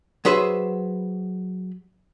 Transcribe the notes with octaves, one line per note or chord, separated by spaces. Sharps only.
F#3 G#4 B4 C5 E5